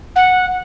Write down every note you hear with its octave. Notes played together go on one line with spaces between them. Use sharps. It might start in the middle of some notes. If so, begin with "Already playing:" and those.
F#5